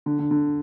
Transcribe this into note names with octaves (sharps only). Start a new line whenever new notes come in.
D3
D3
D3